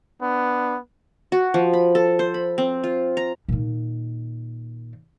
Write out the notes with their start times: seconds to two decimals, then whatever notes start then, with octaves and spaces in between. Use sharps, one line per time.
0.22 B3 D4
1.32 F#4
1.54 F3
1.73 B5
1.95 A4
2.19 C5
2.34 B5
2.58 C4
2.84 F4
3.17 A#5
3.49 A#2 D#3